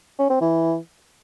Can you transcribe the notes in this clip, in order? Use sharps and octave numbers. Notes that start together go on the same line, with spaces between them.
C#4
C4
E3